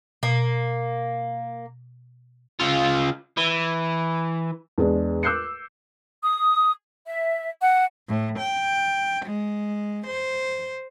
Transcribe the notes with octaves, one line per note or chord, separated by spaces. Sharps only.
B2 A#3
C#3 F4
E3
E2 G#3 D4
D6 E6 F#6 G6 C7 C#7
D#6
E5
F#5
A2
G5
G#3
C5